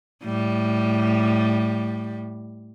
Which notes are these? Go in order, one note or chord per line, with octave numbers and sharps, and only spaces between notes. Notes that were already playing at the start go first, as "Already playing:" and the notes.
A2 G3